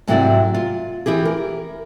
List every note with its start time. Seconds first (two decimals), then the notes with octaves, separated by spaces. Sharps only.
0.07 G#2 C3 F#3 G#3 E4 D5
0.54 F4
1.06 E3 E4 G4 G#4
1.25 A#4